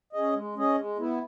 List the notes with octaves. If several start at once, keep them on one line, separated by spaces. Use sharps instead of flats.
C#4 G#4 D#5
G#3
C#4 G#4 D#5
G#3
B3 E4